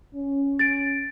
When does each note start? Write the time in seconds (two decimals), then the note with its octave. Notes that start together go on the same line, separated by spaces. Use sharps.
0.15 C#4
0.59 A6 D7